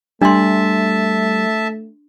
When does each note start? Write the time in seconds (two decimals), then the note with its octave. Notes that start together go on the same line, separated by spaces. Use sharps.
0.22 G3 A3 D4 E5 A5 C6